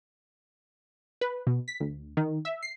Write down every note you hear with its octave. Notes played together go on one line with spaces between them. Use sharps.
B4
B2
B6
D2
D#3
E5
C7